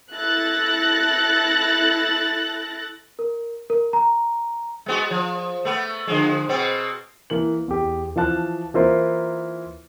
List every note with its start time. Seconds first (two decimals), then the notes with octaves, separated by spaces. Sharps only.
0.12 E4 A4 F#6 A6 A#6
3.19 A#4
3.70 A#4
3.93 A#5
4.86 G#3 B3 F#4
5.11 F3
5.65 A3 B3
6.07 D3 F3 G#3
6.49 B2 B3 C4
7.30 E3 A#3 F#7
7.68 E2 G4
8.16 E3 F3 F5 A5 F#6
8.74 E3 A#3 E4 F4 A#4 C5